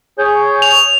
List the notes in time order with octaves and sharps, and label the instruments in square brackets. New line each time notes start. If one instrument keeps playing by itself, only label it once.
[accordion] G#4 C#5 G6
[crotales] F7